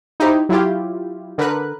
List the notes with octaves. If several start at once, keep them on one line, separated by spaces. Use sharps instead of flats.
D#4 E4 G4 C5
F#3 E4 F4 G4
D3 A#4 B4 F#6